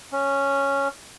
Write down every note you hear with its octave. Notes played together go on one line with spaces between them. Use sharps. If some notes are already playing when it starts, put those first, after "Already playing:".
C#4